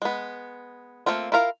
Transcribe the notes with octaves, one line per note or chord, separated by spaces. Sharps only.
G#3 B3
A3 A#3 C4 F4
E4 F4 A#4 F5